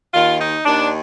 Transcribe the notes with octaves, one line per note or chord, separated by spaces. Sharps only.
D#2 D#3 F4
D#4
D#2 D#3 D4